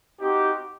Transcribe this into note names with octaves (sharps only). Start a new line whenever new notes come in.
C4 D#4 F#4 G4